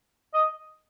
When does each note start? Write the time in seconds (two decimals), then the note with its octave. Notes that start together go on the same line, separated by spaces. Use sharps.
0.34 D#5